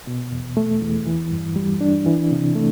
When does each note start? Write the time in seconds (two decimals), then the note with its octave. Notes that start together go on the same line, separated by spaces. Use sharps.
0.07 B2
0.32 E2
0.57 A3
0.82 E2
1.07 E3
1.31 G2
1.56 G3
1.81 D4
2.06 E3
2.31 C3
2.55 A3